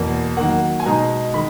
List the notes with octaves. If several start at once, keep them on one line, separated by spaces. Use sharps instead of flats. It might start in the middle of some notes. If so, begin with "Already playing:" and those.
Already playing: E2 B2 A#3
D#3 F#3 A#3 F#5
G#5
B2 G#3 D#4 A#5
D#3 G#3 B5